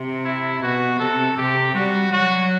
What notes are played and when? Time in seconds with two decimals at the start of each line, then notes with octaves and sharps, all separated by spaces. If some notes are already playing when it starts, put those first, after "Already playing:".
Already playing: C3
0.24 E4
0.61 B2 F#4
0.99 C3 A4
1.37 C3 G4
1.75 G3 F#4
2.12 F#3 F#4